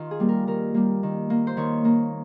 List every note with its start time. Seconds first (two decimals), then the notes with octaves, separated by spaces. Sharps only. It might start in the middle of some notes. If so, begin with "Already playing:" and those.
Already playing: D#3 F4
0.11 G#4
0.20 G3 A#3
0.29 A#4
0.47 D#3 A#4
0.74 G3 A#3
1.03 D#3
1.30 A#3
1.47 C5
1.57 D#3 C#5
1.85 A#3